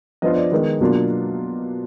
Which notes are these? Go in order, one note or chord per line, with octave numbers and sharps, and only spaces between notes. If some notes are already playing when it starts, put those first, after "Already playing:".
F3 B3 D4 F4 D#5
D5
D#3 G#3 B3 D#4 A#4
B2 F#3 A#3 D4 F4